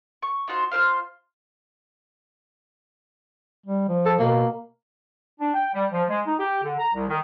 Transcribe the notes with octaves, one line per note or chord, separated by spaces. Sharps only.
C#6
D#4 F4 F#4 C5
F4 A#4 C5 F5
G3
F3
A4
B2 A#3
D4
G5
G3
F3
G#3
D#4
G4
D3
A#5
C2
D#3